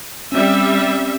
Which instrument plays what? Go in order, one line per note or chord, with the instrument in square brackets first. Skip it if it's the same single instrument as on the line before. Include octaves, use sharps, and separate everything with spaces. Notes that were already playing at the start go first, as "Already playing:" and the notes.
[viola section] G3 E5 [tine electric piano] C4 C#4